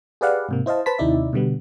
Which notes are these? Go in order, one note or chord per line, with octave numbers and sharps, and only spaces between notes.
G4 G#4 B4 D5 F5 F#5
G#2 C3 A#3
E4 C5 D#5 F5 A5
B4 C5 A5 B5 B6
D#2 C3 D#4 E4 D5 E5
B2 D3 G3 B3